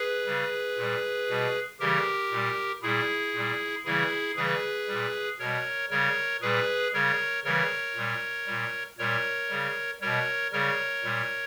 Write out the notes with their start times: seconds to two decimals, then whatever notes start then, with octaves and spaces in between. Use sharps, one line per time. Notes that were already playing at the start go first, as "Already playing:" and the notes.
Already playing: G#4 B4
0.26 C#3 G3
0.77 A#2 G3
1.29 B2 G3
1.80 C#3 E3 G3 G4 A#4
2.31 A#2 G3
2.82 A#2 G3 E4 G#4
3.34 A#2 G3
3.85 C#3 E3 G3 E4 G#4
4.37 C#3 E3 G3 G#4 B4
4.88 A#2 G3
5.39 B2 G3 A#4 C#5
5.90 C#3 G3 A#4 C#5
6.42 A#2 G3 G#4 B4
6.93 C#3 G3 A#4 C#5
7.44 C#3 E3 G3 A#4 C#5
7.96 A#2 G3
8.47 A#2 G3
8.98 A#2 G3 A#4 C#5
9.50 C#3 G3
10.01 B2 G3 A#4 C#5
10.52 C#3 G3 A#4 C#5
11.04 A#2 G3